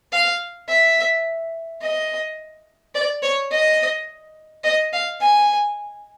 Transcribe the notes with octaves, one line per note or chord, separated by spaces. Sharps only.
F5
E5
D#5
D5
C#5
D#5
D#5
F5
G#5